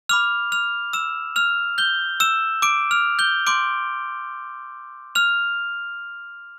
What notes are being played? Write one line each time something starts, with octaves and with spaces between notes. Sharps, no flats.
B5 D6 F6 F7
F6 F7
E6 E7
F6 F7
G6 G7
E6 E7
D6 D7
F6 F7
G6 G7
C6 D6 G6 D7
F6 F7